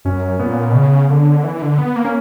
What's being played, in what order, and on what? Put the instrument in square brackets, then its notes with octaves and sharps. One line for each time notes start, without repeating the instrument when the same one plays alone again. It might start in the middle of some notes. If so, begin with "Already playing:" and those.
[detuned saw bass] F#2 [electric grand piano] C#4
[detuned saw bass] A#2 [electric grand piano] B3
[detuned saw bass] B2
C#3
D3
E3
D3
B3
A#3
[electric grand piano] C#4